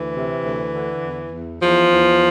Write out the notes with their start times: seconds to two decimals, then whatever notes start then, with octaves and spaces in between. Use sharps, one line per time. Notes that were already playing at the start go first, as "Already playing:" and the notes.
Already playing: D2 E3
0.14 C3
0.43 D2
0.73 D3
1.02 E2
1.32 E2
1.62 E2 F3
1.90 E2